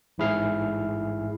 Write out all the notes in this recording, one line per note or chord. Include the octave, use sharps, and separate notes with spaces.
A1 G#2 E4 G#4 F6 C7